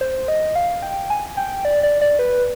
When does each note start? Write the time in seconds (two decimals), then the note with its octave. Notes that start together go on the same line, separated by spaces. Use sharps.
0.01 C5
0.28 D#5
0.56 F5
0.82 G5
1.10 G#5
1.37 G5
1.65 D5
1.83 D5
2.01 D5
2.19 B4